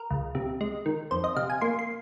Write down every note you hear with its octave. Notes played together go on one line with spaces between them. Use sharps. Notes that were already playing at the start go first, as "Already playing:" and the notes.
Already playing: A#4
C#2
C3
G#3
D#3
F2 C5
D#5
C3 F5
G#5
A#3 C6
C6